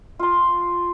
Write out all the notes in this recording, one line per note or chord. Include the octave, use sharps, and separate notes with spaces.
F4 C6